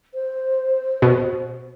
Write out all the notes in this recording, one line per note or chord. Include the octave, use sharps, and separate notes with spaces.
C5
B2